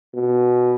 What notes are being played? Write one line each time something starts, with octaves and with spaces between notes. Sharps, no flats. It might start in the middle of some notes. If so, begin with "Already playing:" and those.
B2